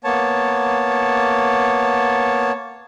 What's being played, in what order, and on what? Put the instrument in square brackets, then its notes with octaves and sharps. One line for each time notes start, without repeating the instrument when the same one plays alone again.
[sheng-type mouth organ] A#3 B3 C#5 A5